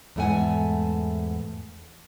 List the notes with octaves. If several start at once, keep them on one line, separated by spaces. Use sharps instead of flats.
E2 G#2 A3 F#5 G#5